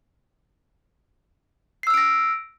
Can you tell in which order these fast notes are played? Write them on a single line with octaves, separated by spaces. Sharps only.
C7 E6 F6 D7 A#6